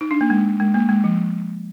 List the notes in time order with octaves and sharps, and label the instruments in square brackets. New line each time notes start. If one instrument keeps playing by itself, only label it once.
[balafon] D#4
D4
A#3
G#3
G#3
A#3
G#3
F3